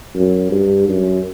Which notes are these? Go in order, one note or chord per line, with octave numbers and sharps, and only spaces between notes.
F#2
G2
F#2